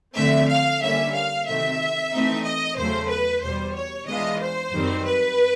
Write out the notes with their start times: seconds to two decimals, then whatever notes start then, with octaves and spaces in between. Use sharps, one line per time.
0.16 D3 F3 A3 C4 E5
0.49 F5
0.81 D3 G3 A#3 C#4 E5
1.15 F5
1.47 C3 D#3 F#3 A3 C4 E5
2.12 E3 A3 C4 D#4
2.44 D#5
2.77 E2 C#3 F#3 A3 C5
3.09 B4
3.42 E2 B2 G3 C5
3.75 C#5
4.08 E3 G#3 B3 D4 F4 D#5
4.40 C5
4.73 F#2 D#3 G3 C4
5.05 B4